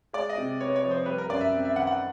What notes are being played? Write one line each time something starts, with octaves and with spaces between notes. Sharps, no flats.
G#3 D5
D#5
C3
B3 C#5
C#5
F3
C5
G3 B4
A#4
F#2 D5
E5
C4
E5
D#3 F#5
F#5